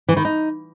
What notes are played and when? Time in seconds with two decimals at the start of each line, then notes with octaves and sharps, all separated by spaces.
0.09 E3
0.17 D#3
0.25 D#4